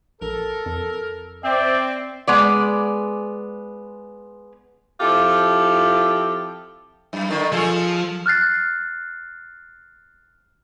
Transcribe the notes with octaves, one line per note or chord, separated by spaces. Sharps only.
A#1 A4 A#4
F2
C4 D5 E5 G5
G#3 B3 D5
F3 C4 E4 F4 G4 A4
F#2
D3 D#3
F3 G#4 A4
F6 F#6 A6 C7